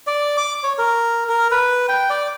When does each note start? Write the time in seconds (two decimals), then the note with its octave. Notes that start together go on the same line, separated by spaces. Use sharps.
0.07 D5
0.37 D6
0.64 C#5
0.78 A#4
1.29 A#4
1.51 B4
1.89 G5
2.10 D5